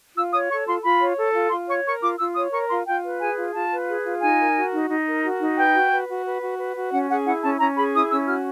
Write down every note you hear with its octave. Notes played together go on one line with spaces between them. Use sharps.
F4 E6
C#5 D#6
A4 C#6
F4 C6
F4 B5
C#5
A4
F4
F4 C6
C#5 C#6
A#4 C#6
F4 D6
F4 E6
C#5 D#6
A#4 C#6
F4 C6
F4 G5
B4
G#4 G#5
F4
F4 A5
B4
G#4
F4
D#4 G#5
A#4
F#4
D#4
D#4
A#4
F#4
D#4
B4 G5
F#4
B4
F#4
B4
F#4
B4
F#4
C#4 F#5
G#4 F#5
E4 F#5
C#4 A5
C#4 A#5
G#4 B5
E4 D#6
C#4 E6
F#4 F6